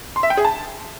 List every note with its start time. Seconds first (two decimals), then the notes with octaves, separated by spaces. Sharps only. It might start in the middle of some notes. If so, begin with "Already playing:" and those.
0.16 C6
0.23 E5
0.30 G5
0.37 G#4
0.45 A5